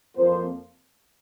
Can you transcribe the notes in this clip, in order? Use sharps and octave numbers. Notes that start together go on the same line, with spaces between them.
F2 F3 A#3 C5